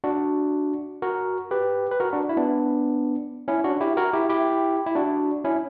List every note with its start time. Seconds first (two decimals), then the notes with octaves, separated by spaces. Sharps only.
0.04 D4 F#4
1.02 F#4 A#4
1.51 G4 B4
1.91 B4
2.00 F#4 A#4
2.13 D4 F#4
2.29 E4
2.37 B3 D4
3.48 C#4 E4
3.64 D4 F#4
3.81 E4 G4
3.97 F#4 A#4
4.13 E4 G4
4.29 E4 G4
4.86 E4
4.95 D4 F#4
5.45 C#4 E4